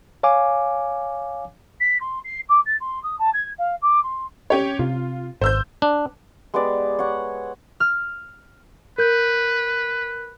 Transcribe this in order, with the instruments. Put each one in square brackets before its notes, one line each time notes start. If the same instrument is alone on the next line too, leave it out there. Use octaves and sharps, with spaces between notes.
[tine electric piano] C#5 F5 G#5 D6
[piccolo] B6
C6
C7
D6
A6
C6
D#6
A5
G#6
F5
D6
C6
[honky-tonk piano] C#4 G4 C#5
[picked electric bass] C3 [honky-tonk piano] F4
[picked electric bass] G#1 [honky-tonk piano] C5 E6 G6
[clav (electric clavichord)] D4
[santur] G#3 B3 G4 D5
C#5 F#5
[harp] F6
[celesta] A#4 G6 [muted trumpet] B4